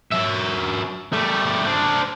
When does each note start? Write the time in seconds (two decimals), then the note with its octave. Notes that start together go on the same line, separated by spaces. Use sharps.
0.11 F#3 E5
1.13 G3 A3
1.66 D4 C5